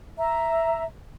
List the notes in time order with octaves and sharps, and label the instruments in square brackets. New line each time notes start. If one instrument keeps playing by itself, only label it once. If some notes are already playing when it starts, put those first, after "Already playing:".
[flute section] E5 A#5